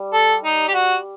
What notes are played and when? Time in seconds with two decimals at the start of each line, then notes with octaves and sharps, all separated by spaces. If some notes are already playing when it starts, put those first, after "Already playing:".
Already playing: G3
0.13 A4
0.44 D#4
0.68 G4
0.74 F#4